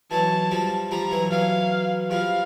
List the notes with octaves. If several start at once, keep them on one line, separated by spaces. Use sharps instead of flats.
E3 F#3 A5
F3 G3
F3 G3 A#5
E3 F#3
E3 F#3 F5
F3 G3 F5